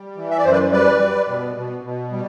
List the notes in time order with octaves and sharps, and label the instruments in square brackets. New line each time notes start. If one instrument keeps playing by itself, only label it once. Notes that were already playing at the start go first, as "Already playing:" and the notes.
Already playing: [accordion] G3
E3
E5
D5
F#2 C5
B4 D5
G3 B4 D5
G3
B2
B2
B2
G3